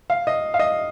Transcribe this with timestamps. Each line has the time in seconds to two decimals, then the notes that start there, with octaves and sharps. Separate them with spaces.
0.10 F5
0.27 D#5
0.54 F5
0.59 D#5